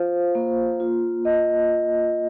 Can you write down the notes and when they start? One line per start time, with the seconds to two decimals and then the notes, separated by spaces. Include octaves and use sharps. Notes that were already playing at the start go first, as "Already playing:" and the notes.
Already playing: F4 C5 F5
0.35 A#3
0.80 F4
1.25 D#5